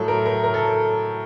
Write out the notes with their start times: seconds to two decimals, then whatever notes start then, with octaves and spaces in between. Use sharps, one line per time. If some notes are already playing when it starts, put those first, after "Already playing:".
Already playing: A2 F#3 A4
0.08 A#4
0.26 A#4
0.44 A#4
0.54 A4